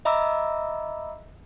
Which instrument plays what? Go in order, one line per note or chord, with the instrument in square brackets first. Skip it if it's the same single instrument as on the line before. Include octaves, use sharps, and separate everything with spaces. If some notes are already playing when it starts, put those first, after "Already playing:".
[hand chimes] D#5 E5 A#5 B5 D6 E6